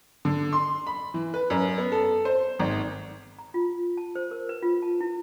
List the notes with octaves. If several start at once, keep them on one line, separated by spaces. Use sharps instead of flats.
D3
C6
B5
E3
B4
F#2
B3
A4
C5
G#1
A#5
F4
A5
C5
A#4
B4
F4
A5
E4